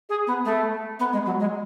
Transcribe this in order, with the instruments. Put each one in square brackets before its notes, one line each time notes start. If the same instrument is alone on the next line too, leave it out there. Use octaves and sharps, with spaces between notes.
[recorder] G#4
B3
A3
B3
G#3
F#3
G#3